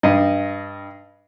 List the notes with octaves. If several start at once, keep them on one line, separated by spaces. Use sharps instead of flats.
G2 D#5